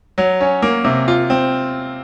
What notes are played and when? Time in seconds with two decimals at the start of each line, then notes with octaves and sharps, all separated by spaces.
0.18 F#3
0.40 C#4
0.62 A#3
0.84 C3
1.08 F4
1.30 C4